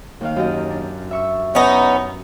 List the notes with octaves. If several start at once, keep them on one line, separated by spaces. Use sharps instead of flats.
D#2 D#3 F5
F#2 G4 D#5
D4
E5 C#6 E6
B3 C#4 D#4